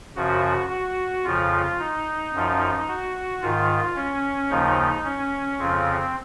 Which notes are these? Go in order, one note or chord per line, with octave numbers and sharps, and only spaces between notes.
F#2 C#3 F3 F#4
F#4
F2 C#3 F3 F4
D#4
F#2 F3
F#4
G#2 D#3 F4
C#4
D#2 C#3 F3 D#4
C#4
F2 C#3 F3 C4